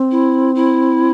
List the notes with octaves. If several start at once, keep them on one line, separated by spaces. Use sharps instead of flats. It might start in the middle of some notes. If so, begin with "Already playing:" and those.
Already playing: C4
E4
E4